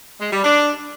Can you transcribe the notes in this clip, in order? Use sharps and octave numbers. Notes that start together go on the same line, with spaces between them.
G#3
G3
D4